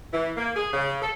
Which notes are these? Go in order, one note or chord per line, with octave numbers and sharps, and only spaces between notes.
E3
A#3
G#4
C#3
A4